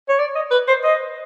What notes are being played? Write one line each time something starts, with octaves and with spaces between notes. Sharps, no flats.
C#5
D5
D#5
B4
C5
D#5